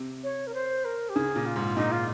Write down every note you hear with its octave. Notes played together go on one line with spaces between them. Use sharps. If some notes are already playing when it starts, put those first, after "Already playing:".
Already playing: C3
C#5
A#4
C5
A#4
G4
C#3 G#4
A#2
F4
G#2
A#2 D#4
F4